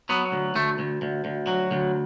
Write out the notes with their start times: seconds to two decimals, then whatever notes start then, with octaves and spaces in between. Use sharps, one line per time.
0.09 F#3 B3
0.32 D2
0.55 D2 A3
0.79 D2
1.02 D2
1.25 D2
1.47 F#3
1.71 D2